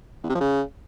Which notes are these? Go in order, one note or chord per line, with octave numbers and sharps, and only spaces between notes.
E2
C3
F3
C#3